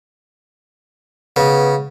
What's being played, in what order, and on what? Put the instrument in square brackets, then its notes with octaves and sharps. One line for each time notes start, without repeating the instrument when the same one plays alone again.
[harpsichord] C#3 [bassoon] B3